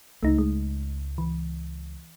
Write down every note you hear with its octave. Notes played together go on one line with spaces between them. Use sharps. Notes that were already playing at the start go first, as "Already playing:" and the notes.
C#2 A3 D#4
G#3
E3